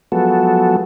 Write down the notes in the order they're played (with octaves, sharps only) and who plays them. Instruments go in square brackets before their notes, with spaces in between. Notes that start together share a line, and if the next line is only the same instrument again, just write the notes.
[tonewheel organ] F3 F#3 G#3 B3 F#4 A4